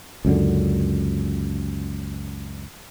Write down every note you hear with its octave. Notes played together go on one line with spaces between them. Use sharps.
C#2 F#2 D3